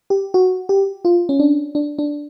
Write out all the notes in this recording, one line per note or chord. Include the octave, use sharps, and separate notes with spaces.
G4
F#4
G4
F4
C#4
D4
D4
D4